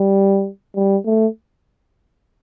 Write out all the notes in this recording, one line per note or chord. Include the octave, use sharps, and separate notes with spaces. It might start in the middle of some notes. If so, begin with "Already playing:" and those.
Already playing: G3
G3
A3